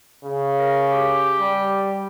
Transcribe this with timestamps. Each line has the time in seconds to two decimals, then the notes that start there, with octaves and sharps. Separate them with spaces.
0.24 C#3
0.59 A#4
0.92 G4
1.38 G3